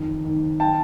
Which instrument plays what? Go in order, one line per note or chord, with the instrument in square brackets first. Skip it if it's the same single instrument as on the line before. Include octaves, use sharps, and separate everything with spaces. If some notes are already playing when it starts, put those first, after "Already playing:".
Already playing: [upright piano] F2 D#3
D#3
G5 A5